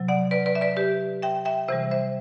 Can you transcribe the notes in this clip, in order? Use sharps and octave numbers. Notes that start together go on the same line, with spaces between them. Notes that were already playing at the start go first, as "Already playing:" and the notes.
Already playing: C3 F#3
D5 F#5
B4 D5
B4 D5
E5
B4 D5
G4 B4
E5 G5
E5 G5
C3 E3 G3 C5 E5
C5 E5